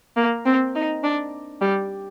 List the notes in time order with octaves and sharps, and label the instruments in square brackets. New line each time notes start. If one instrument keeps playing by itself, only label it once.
[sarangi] A#3
C4
D#4
D4
G3